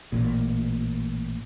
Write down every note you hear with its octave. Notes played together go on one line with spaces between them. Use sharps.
A1 A#2